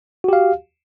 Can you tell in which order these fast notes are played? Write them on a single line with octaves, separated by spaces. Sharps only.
F#4 G4 F5